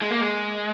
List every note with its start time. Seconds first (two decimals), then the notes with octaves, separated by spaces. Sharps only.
0.02 G#3
0.11 A#3
0.21 G#3